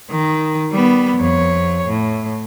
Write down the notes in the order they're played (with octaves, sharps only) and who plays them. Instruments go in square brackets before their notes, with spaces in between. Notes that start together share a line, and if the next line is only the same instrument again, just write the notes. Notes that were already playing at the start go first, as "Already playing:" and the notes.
[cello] D#3
G3 B3
F2 C#5
A2